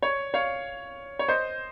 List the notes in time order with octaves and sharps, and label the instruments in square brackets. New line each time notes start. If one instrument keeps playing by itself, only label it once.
[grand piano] C#5
C#5 F5
C#5
C5 D#5